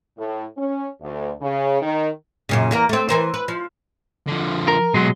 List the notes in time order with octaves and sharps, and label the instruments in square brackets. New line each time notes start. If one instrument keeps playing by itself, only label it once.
[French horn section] A2
C#4
D2
C#3
D#3
[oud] F#2 A#2 C#3
E2 A#3 A#4
A3 C4
E3 A#4 C5
B4
F3
[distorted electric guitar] D3 F3
[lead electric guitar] A#4
[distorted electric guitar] B2 C6 [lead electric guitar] F#3 G#3